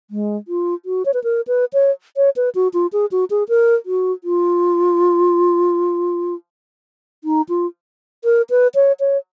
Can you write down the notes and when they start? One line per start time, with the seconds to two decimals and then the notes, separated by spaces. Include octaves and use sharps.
0.11 G#3
0.48 F4
0.86 F#4
1.05 C#5
1.14 B4
1.24 A#4
1.48 B4
1.73 C#5
2.17 C#5
2.36 B4
2.55 F#4
2.74 F4
2.93 G#4
3.12 F#4
3.30 G#4
3.49 A#4
3.86 F#4
4.24 F4
7.24 D#4
7.49 F4
8.24 A#4
8.50 B4
8.75 C#5
9.00 C#5